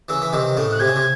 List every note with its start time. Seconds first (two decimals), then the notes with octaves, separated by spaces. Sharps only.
0.09 C#3 E3 E6
0.22 E3
0.33 C3 D#3
0.57 A2 C#3
0.72 F#6
0.80 C3 G#6
0.88 C#3
0.96 C3